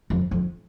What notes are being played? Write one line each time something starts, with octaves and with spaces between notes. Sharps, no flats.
F2
F2